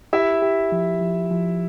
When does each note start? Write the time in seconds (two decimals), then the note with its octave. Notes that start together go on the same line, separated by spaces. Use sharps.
0.13 E4 G4 E5
0.42 G4
0.72 F3
1.01 F3
1.31 F3